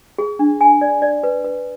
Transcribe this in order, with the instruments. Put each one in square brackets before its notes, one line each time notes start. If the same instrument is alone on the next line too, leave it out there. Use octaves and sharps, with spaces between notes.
[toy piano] G#4
D4
G#5
D5
D5
B4
B4